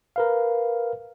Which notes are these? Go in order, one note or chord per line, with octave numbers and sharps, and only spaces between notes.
A#4 B4 F5